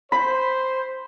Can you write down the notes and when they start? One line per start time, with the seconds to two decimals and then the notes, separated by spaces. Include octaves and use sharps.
0.12 C5 B5